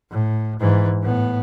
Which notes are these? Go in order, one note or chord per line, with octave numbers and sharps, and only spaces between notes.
A2
G#2 E3
A2 B3